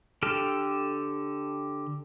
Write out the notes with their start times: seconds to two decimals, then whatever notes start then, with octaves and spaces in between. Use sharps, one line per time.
0.22 D3 G4 A4 F6